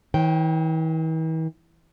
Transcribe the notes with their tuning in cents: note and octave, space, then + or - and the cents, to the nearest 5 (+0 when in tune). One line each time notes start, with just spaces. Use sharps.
E3 -45 C#5 -40 G5 -10